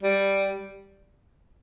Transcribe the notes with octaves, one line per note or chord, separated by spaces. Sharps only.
G3